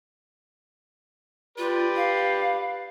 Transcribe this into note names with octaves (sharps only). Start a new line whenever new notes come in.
F4 G4 B4 D5
F5